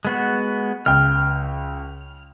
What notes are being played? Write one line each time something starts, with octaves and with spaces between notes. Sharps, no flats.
G#3 B3 F#4
C#2 G5 F6